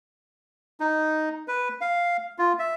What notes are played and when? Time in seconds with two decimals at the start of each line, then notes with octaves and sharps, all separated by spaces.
0.80 D#4
1.48 B4
1.81 F5
2.39 F4
2.59 E5